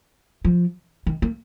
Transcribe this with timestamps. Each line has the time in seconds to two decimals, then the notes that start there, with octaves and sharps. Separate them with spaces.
0.45 F3
1.07 D#3
1.22 A#3